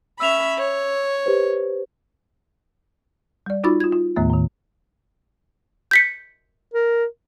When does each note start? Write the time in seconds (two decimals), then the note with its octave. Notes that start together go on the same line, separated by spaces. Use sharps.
0.20 C#4 E5 B5 E6 F7
0.57 C#5
1.26 G4 B4 C5
3.46 G3 D5
3.64 D#4 F4 F#4 B5 D6 A6
3.80 F4 G#6
3.92 F4
4.16 D#2 A2 D#3 A3 B3
4.30 A2 D#3
5.91 G6 B6 C#7
6.74 A#4